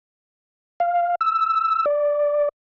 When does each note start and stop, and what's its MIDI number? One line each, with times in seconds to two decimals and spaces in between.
0.80 1.15 77
1.21 1.85 88
1.86 2.49 74